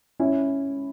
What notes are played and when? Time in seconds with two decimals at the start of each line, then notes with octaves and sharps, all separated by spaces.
0.20 C#4 E4